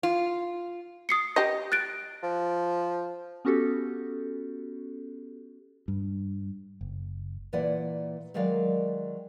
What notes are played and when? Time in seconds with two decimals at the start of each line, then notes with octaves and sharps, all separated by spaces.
0.03 F4
1.09 D#6 C7 C#7
1.36 G4 D#5 A#6
1.72 F#6 A6 D7
2.23 F3
3.45 B3 C#4 F#4 G4 A4
5.88 G2
6.81 F#1
7.53 A#2 E3 B4 D5 F#5
8.34 D#3 F#3 G#3 A#4 D5 F5